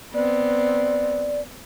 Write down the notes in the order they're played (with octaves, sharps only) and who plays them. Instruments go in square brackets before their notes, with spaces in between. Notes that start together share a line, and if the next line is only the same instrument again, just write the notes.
[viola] B3 C4 [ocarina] D5